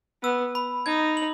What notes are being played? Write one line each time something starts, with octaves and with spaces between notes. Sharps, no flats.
B3 E6
B5
D#4 G#6
F#7